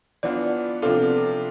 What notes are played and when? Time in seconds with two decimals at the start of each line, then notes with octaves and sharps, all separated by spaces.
0.23 E3 B3 D4 F4 D5
0.82 C3 F3 B3 D4 F4 A4